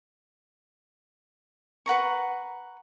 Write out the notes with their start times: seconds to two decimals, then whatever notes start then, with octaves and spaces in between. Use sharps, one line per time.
1.86 B4 F#5 A#5 C#6